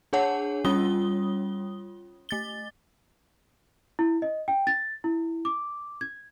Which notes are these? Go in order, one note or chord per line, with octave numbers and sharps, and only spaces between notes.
D4 G#4 C#5 F#5 A5
G3 C#4 F4 D#6 G7
A3 A6 G7
E4
D#5
G5
A6
E4
D6
G#6